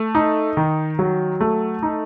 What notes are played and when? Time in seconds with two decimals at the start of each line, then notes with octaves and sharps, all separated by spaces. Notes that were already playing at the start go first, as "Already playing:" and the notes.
Already playing: A3
0.15 D#4
0.57 D#3
0.99 F#3
1.41 A3
1.83 D#4